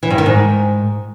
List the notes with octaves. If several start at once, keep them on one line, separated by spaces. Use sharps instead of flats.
E3
G2
D#3
G#2